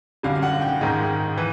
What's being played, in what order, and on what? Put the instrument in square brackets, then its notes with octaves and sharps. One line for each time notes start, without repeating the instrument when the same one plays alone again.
[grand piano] F#2 D3 G3 [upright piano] F5
[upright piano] F5
F#5
G5
[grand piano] G#2 D#3 G#3
E3